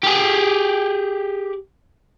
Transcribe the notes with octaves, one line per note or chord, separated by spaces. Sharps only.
G4 G#4